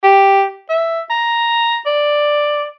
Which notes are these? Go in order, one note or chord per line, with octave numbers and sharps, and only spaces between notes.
G4
E5
A#5
D5